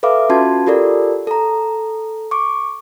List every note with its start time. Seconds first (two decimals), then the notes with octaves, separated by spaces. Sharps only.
0.03 A4 B4 E5 F5 D6
0.29 C#4 F4 F#4 A5 C6 G#6
0.67 F4 G4 A4 A#4 D5
1.27 A4 A#5
2.31 C#6 D6